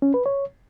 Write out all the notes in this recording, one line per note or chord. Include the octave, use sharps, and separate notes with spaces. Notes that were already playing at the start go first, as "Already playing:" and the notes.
C#4
B4
C#5